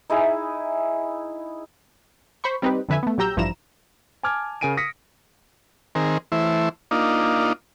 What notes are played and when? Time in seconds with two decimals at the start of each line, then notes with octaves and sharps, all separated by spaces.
0.10 D#4 E4 G#4
2.44 C5 B5 C#6
2.62 G3 C4 D#4 G4 B4
2.89 F2 D3 B4 E5 G#5
3.03 A3 B3
3.18 A#1 F#3 G4 A#5 E6 G6
3.37 A1 G2 F3 E4 A#5 E7
4.23 G#5 A5 D6 F6 G#6
4.61 C#3 A#4 G#5 D7 D#7
4.77 D#6 A#6 B6 C#7
5.95 D#3 C4 G#4 A#4
6.32 E3 A3 E4 C5
6.91 A#3 D4 D#4 F4